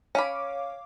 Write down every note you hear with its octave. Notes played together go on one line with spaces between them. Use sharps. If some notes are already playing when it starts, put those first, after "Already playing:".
C#4 C#5 F5 B5 D6